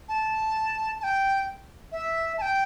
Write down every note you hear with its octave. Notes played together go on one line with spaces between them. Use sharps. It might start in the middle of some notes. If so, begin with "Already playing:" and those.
A5
A5
G5
E5
A5
G5